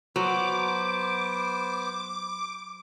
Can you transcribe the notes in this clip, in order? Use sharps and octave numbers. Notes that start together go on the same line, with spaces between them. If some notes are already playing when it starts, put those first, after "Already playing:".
F#3 B3 C5 D6